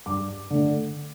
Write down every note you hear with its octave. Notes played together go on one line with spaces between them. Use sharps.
G2 D6
D3 A3